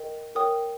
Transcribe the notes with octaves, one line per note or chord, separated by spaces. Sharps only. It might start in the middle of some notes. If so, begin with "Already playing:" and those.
Already playing: A#4 D#5 G5
A#4 C#5 G5 D#6